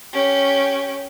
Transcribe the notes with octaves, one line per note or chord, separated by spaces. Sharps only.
C#4 G4